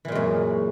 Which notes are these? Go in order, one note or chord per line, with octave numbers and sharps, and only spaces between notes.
F#2 A#2 E3 G#3